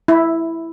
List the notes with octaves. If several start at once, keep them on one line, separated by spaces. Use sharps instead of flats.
E4